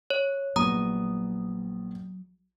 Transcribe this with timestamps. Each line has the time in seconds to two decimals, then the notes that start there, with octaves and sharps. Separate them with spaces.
0.10 C#5
0.56 A#1 F#3 B3 A#5 D#6